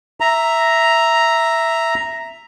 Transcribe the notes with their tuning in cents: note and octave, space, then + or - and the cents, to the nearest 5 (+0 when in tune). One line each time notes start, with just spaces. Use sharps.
E5 +0 A#5 +0